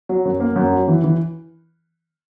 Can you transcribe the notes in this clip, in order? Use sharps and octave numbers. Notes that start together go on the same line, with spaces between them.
F#3
F#2
A#3
F#2
F#3
E3
E3